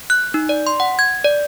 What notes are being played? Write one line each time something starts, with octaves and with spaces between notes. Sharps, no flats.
F#6
D#4
D5
C6
F#5
G#6
D5